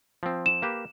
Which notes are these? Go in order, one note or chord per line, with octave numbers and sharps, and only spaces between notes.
F3 C4
E7
A#3 G4 B4